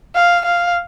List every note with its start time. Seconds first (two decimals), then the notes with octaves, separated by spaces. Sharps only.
0.15 F5
0.45 F5